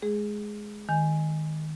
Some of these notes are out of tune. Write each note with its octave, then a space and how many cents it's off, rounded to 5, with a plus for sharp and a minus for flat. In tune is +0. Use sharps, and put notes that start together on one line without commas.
G#3 +15 G#4 +0
D#3 +0 G#5 +0